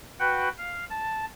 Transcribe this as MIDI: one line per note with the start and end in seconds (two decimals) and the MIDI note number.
0.20 0.49 66
0.20 0.49 71
0.20 0.49 78
0.20 0.49 79
0.58 0.85 77
0.90 1.25 81